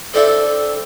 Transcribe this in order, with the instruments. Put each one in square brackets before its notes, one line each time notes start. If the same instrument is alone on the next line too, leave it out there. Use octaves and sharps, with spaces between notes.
[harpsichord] C4 D4 E5 [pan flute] A4